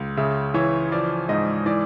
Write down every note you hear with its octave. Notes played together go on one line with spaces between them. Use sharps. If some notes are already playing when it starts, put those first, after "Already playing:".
Already playing: C#2
C#3 E5
E3 C#5
F3 D5
G#2 D#5
E3 D5